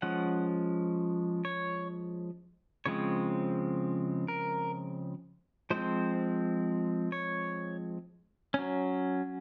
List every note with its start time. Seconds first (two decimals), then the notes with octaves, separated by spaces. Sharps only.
0.02 F3 G#3 C#4 F#5
1.45 C#5
2.86 C#3 F3 G#3 C4 C#5
4.28 A#4
5.70 F3 G#3 C4 C5
7.12 C#5
8.54 F#3 C#4